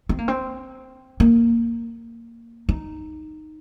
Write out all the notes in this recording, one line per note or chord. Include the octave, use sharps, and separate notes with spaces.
C4
A#3
C4
A#3
D#4